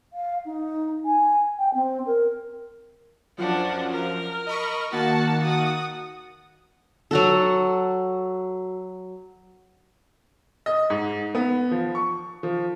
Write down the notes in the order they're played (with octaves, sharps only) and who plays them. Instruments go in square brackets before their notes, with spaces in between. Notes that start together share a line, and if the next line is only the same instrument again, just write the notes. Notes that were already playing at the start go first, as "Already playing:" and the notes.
[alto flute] F5
D#4
G#5
G5
C4
A#4
[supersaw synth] F#2 F3 [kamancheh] D4 F#5
[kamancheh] A#4
[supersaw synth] D#5 B5 C#6
[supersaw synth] D#3 A#3 A6 [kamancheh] F#4 A5
[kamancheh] F#4 D#6
[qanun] F#3 F#4 A4
[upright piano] D#5
G#2
B3
F3
C#6
F3